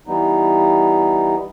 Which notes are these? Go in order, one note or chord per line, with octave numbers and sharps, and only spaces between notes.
E3 G3 B3 D#4